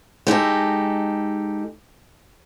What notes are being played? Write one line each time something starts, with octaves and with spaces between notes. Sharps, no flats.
G#3 D#4 G4 A4